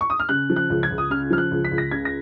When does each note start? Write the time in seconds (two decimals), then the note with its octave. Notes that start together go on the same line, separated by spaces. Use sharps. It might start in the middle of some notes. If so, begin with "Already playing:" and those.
0.01 C#6
0.10 D#6
0.19 F6
0.29 C#3 F#6
0.50 F3
0.56 F#6
0.70 C#2
0.83 G#6
0.90 C#2
0.98 D#6
1.11 C#3 F6
1.31 F3 F6
1.38 F#6
1.51 C#2
1.65 B6
1.71 C#2
1.78 A#6
1.91 C#3 G#6
2.05 A#6